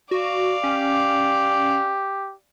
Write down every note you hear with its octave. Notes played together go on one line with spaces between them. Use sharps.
F#4 D5 F5
C#4 G4